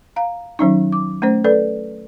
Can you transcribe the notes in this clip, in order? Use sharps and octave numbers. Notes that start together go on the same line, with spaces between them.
F5 A#5
D#3 F#3 C#4 D#4
D6
A3 C#4 C5
A4 B4 D5